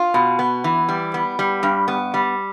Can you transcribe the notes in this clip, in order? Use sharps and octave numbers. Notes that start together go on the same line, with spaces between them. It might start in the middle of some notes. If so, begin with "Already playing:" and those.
Already playing: F4
B2
B3
E3
G3
B3
G3
G2
B3
G3